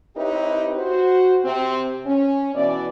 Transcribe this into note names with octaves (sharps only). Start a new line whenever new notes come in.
C4 D#4 E4 G4 B4 C#5
F#4 C5
C3 C4
C#4
B2 E3 D5